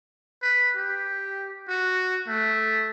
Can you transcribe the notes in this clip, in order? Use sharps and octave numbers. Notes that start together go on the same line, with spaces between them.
B4
G4
F#4
A3